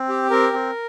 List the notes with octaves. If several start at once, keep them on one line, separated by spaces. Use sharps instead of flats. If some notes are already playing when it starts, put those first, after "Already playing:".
Already playing: C4
G4
C4 A#4
C4